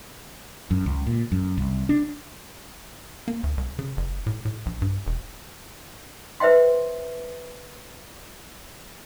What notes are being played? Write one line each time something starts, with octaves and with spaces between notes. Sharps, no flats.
F#2
C#2
A#2
F#2
C2
D4
A#3
D2
C2
C#3
F#1
A2
A2
A#1
G2
E1
B4 C5 E5 G5 C6